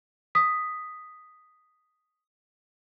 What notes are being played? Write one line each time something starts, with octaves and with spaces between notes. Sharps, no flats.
D#6 B6